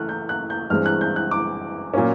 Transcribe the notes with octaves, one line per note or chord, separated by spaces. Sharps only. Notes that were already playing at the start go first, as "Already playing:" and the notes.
Already playing: E3 A3 F6 F#6
G6
F#6
G6
G2 E3 G#3 C4 F6
F#6
G6
F#6
D6
A#2 F#3 A#3 C#4